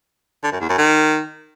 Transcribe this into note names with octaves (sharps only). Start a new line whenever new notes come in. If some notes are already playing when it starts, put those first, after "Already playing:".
D3
F#2
E2
F#2
D#3